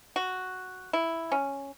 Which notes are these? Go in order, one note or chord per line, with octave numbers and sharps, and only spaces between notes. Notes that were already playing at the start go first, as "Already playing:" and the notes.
F#4
E4
C#4